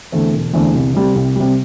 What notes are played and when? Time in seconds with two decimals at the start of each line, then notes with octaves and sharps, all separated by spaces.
0.12 E2 D3 A3 C4
0.33 E1
0.54 E2 D3 A3 C4
0.74 C2
0.94 C3 G3
1.15 C2
1.36 C3 G3